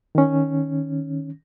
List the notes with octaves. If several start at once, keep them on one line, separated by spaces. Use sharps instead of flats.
D#3 C#4